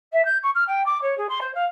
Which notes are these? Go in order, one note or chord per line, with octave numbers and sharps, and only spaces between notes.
E5
G6
C#6
F6
G5
D6
C#5
G#4
C6
C5
F5